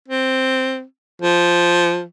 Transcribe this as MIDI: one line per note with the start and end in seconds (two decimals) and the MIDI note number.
0.08 0.83 60
1.22 2.03 53